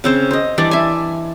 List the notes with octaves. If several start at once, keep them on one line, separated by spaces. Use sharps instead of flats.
C#3 C4 C5
C5 D#5
E3 G3 D4 D5
E5 G#5